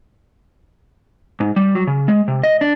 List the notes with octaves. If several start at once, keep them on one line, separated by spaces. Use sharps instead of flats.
G#2
G3
F#3
C#3
G#3
C3
D#5
D4